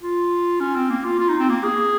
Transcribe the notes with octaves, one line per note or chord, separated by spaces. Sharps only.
F4
C#4
C4
A#3
F4
F4
D#4
C4
A#3
G#4